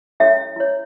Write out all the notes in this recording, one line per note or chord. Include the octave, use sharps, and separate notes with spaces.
C#4 E4 A4 C#5 E5
E4 C#5